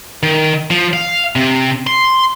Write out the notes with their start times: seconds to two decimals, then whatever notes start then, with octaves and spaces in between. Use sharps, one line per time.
0.23 D#3
0.70 F3
0.93 F5
1.36 C3
1.87 C6